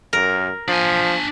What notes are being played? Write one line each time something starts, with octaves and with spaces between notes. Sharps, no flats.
F#2 A#4
F3 D4 G#5